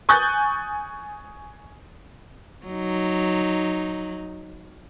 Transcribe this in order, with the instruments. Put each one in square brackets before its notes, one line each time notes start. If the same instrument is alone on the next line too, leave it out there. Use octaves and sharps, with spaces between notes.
[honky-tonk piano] G#5 C#6 D#6 F#6 G6 A6
[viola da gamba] F#3 D#4